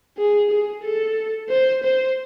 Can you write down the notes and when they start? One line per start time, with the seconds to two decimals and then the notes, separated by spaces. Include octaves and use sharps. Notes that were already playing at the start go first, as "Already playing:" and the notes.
0.18 G#4
0.51 G#4
0.84 A4
1.49 C5
1.83 C5